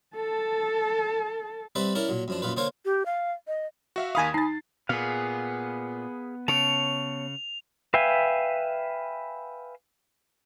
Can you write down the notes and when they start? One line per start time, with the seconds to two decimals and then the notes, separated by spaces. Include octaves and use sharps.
0.16 A4 A5
1.75 G3 C4 B4 D5 E5
1.95 C#4 E4 A#4 D5
2.09 A#2 F#3
2.28 F#2 F3 D4
2.42 F#2 A#2 F4 B4
2.57 D3 A#3 C5 C#5 F5
2.85 G4
3.06 F5
3.47 D#5
3.96 F#4 E5 F5
4.15 D#2 D#3 F5 G#5 B5 D#6
4.34 D#4 A6 C7
4.89 A#2 B3 G#4 F5
6.48 C#3 C#5 A5 F7
7.94 B4 E5 F5 G5 G#5